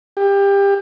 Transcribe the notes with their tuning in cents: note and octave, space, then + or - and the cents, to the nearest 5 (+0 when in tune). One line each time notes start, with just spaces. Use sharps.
G4 +25